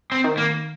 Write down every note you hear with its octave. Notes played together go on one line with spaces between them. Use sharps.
C4
D#3
A#3